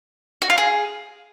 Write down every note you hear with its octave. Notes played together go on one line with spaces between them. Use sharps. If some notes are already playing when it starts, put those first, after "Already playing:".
F#4
F4
G#4